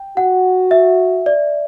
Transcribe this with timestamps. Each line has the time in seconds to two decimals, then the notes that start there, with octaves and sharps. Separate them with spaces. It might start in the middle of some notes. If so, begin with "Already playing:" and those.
Already playing: G5
0.17 F#4 F#5
0.71 E5
1.26 D5